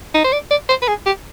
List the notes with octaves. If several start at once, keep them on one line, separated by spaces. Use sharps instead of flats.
D#4
C5
D5
D5
C5
B4
G#4
G4